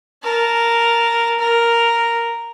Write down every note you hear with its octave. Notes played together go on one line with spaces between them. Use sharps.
A#4 A5
A#4